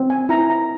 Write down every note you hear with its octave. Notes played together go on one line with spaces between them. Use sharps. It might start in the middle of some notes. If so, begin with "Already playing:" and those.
Already playing: C4
G#5
E4 A#5
A#5